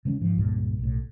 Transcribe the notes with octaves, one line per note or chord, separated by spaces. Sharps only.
C#3 G#3 A#3 C#4
G#2 F3
C#2 G2 A#2
B1 A2